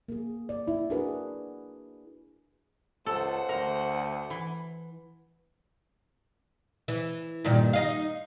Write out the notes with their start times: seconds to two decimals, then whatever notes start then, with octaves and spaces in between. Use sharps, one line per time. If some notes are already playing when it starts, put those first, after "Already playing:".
0.08 A#3 G#4
0.49 D5
0.68 E4
0.90 D4 E4 F#4 G#4 A#4 B4
3.06 C#2 A4 C5 F#5
3.49 D2 A#4
4.30 E3
6.88 E3
7.44 G2 A#2 D#3
7.73 D#4 D#5 F5